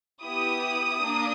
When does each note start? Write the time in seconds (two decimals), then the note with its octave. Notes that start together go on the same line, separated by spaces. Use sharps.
0.23 B3 E4 G4 D#6
1.02 A#3 D4